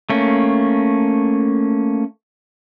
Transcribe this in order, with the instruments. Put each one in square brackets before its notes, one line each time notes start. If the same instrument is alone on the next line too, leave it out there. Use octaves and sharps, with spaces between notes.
[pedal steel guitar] A3 A#3 C#4